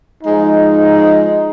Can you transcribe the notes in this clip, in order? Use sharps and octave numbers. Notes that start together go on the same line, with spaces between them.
F3 G#3 D#4